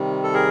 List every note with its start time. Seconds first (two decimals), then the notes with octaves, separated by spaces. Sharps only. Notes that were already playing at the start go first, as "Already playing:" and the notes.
Already playing: C3 D#3 G3
0.24 A4
0.33 G#4 A#4